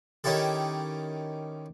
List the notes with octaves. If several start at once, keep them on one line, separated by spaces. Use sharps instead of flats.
D#3 C#4 E4 G4 A4